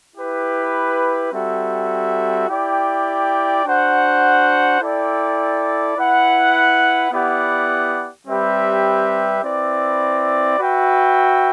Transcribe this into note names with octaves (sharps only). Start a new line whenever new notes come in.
E4 G4 B4
G3 C4 F#4 A4 E5
E4 G4 D5 G5
D4 F#4 C5 F#5
E4 A4 D5 G5
E4 B4 F#5
B3 E4 G4 D5 F#5
G3 C4 G4 B4 E5
C4 E4 B4 D5
F#4 B4 E5 G5